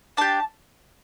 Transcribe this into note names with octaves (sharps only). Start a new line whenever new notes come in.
D4 G4 A5